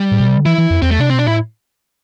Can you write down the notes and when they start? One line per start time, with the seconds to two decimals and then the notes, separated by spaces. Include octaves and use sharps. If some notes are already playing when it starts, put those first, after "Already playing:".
Already playing: G3
0.11 A2
0.20 B2
0.28 C3
0.37 D3
0.46 E3 E4
0.58 E3
0.70 F2
0.82 E2 C4
0.91 A3
0.99 C3 D4
1.10 C4
1.14 B2
1.19 D4
1.27 A2 E4